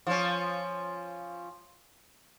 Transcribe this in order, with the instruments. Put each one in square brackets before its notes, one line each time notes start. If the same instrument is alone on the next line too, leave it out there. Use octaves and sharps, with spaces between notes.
[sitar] F3 C#4